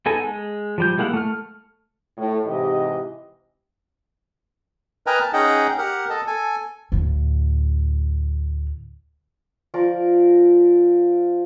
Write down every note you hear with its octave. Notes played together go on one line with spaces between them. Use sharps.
B3 D#4 A4 G#5
G#3
F3 G3 G6
G3 G#3 A#3 E4 F#5
A3 F6
A2
G#2 C3 E3 G4 D#5
A#4 B4 D#5 G5 G#5 A#5
A5
C#4 D#4 G#4 D#5 F#5 G5
G4 A#4 F#5
A4 D#5 A5
A4 G#5
D2 A2
F3 A#4 D5